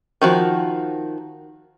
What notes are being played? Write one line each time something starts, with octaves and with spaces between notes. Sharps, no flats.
D#3 F3 F#4